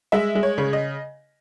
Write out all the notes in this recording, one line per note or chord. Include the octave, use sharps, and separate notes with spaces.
G#3 E5
G#3
C#5
C#3
D#5